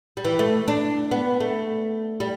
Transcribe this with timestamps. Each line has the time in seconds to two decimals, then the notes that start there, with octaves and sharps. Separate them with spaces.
0.17 G3
0.25 E3
0.39 A3
0.68 D4
1.11 B3
1.40 A3
2.20 G3